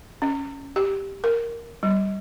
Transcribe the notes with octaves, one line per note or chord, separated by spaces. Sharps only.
C#4
G4
A#4
G3